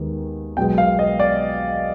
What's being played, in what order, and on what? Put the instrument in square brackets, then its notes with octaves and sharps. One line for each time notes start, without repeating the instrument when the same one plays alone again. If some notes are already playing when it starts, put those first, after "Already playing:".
Already playing: [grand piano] D#2 D#3 G#3 B3
B1 B2 G#3 B3 G5
F5
D#5
D5